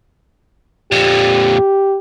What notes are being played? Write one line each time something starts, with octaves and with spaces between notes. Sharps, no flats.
F2 A#2 G4